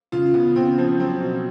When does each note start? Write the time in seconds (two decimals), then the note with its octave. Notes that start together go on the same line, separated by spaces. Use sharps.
0.12 C#3 F4
0.34 C#3 B3
0.56 C#3 C4
0.78 F3
0.99 F#3 C4
1.20 B2